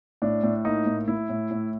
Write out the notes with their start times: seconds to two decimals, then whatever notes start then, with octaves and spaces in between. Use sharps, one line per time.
0.22 A2 D4
0.43 A2
0.65 A#3 D#4
0.86 A2
1.08 A2 E4
1.29 A2
1.51 A2